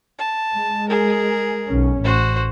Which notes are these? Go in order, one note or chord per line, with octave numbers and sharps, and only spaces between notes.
A5
G#3
G#4 A#4
B1 C#4
A1 F#4 C5